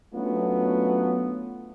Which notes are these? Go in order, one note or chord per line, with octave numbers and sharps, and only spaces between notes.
F#3 A3 B3 C#4 D4 F4